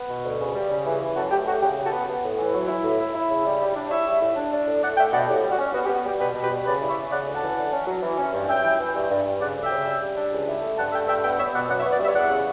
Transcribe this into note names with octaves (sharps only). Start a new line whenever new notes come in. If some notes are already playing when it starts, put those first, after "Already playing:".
Already playing: B3
B2
D2
C#3
G3
C#3
E3
E3
F#2 F#4 A4
A3 G4
A3 F#4
C#3 G4
C#3
F#4 A4
B3
B3
A2
E3
F#3
E4
A2
E4
E4
C#3
G3
G3
D4
E4 C#5 E5
G3
A2
D4
D4
A2
A3 D5 F#5
A3 E5 G5
B2 D5 F#5
A2 G4
G3
F#4
C#4
B3 F#4
G4
B3
F#4
G3 G4
B2 G4 B4
B2
G4 B4
G3
C#3 B4 D5
E4
C#5 E5
C#4
C#3 D5 F#5
D2
F#5 A5
E3
D3
C#4
F#3
E3
C#4
G2
F#2 E5 G5
E3
E3
G2
G2
G2
C#3 D5 F#5
D2
E5 G5
C#3
G3
G3
D4
C#2
E4
A3
G2 F#5 A5
A3 E5 G5
G2 E5 G5
B3 E5 G5
B3 C#5 E5
B2 D5 F#5
F#2 D5 F#5
C#5 E5
B3
B4 D5
G3 C#5 E5
E2 D5 F#5
C#3